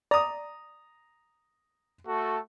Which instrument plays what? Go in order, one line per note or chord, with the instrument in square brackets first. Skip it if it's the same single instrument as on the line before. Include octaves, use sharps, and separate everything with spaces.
[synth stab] D5 [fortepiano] A#5 D#6
[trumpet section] A3 F#4 A4